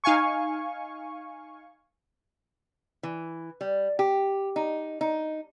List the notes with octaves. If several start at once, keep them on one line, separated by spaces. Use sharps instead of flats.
D#4 F5 G#5 C#6
E3
G3
G4
D#4
D#4